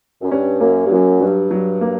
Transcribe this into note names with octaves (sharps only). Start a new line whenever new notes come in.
F#2
G2 C#4
F#2 A#3
G2
F#2 F#3
G2 F#3
F#3
A#3